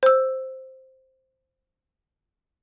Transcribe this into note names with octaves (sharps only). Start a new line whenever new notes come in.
C5 E6